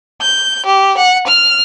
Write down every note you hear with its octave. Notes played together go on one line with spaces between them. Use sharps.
G6
G4
F#5
F6